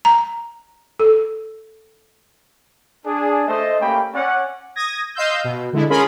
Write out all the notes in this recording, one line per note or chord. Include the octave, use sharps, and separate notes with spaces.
A#5
A4
D4 G#4
A3 C5 D#5
A3 A#3 C#4 G4 G5 B5
C#4 D5 F#5
D#6 G#6 A#6
D#5 F5 C6 E6 G6
B2
D3 G#3 E4
C#4 F4 G#4 A#4 B5 C6